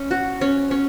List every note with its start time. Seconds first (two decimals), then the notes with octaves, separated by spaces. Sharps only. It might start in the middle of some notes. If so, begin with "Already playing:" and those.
Already playing: C#4
0.11 F#4
0.41 C#4
0.71 C#4